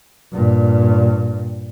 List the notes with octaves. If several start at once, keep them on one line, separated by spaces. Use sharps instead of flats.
G2 A#2